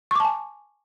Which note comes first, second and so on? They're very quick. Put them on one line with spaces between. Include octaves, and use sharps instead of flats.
C#6 D6 A5 G#5